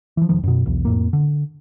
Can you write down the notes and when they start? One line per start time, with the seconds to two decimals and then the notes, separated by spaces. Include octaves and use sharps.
0.17 E3 F3
0.29 E1 D#3 F3
0.43 F#2 B2
0.66 B1 E2
0.85 F2 A2 A#3
1.13 D3